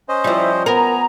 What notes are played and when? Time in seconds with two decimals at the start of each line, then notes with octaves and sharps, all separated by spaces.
0.09 C#4 C5 D#5
0.24 F3 G3 E4 E5
0.66 B3 A#4 G#5 A#5